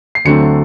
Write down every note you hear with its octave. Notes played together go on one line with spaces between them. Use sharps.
C7
D2 D3 F#3 A3 C4 C#7